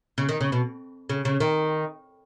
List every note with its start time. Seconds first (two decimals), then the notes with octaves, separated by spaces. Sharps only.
0.18 C#3
0.29 D#3
0.41 C#3
0.52 B2
1.09 C#3
1.25 C#3
1.40 D#3